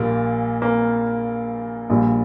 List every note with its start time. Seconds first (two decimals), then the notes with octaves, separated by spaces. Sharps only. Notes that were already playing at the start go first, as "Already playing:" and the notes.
Already playing: A#1 A#2 G3 A#3
0.62 A#3
1.89 A#1 A#2 G3